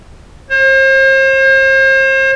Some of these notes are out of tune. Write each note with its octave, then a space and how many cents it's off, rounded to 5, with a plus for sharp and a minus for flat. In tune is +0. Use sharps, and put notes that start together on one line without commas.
C5 +40